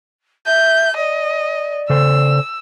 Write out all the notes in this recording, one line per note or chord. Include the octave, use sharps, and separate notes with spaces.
E5 G6
D5 D#5
C#3 A4 C5 E6